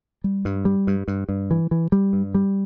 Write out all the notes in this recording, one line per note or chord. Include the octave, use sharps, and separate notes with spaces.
G3
G2
G3
G2
G2
G2
E3
E3
G3
G2
G3